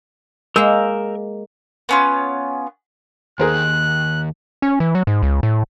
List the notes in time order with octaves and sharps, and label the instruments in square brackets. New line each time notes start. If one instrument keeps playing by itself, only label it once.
[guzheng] G#3 A#3 [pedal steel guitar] A#4 E6 G6
[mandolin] B3 C#4 F4
[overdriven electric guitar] D#2 D#3 [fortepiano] G#4 A#4 C5 [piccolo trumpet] F#6
[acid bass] C#4
E3
F#3
G#2
C#2
A2